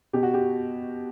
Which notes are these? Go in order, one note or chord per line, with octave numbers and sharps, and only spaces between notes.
B2 G4
F#4
G4